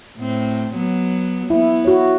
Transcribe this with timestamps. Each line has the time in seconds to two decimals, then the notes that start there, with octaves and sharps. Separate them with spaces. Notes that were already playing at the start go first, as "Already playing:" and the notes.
0.19 A2 C4
0.75 F#3 B3
1.50 B3 E4
1.85 F#4 C#5